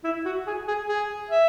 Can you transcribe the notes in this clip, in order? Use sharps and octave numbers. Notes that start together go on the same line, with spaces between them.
E4
F#4
G#4
G#4
G#4
E5